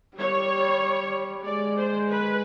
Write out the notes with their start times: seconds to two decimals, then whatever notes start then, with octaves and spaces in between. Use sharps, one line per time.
0.17 G3 C#5
1.45 G#3 D5
1.78 C5
2.09 B4